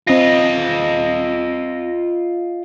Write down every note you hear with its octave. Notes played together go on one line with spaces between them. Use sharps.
C4 F4 D#5 A#6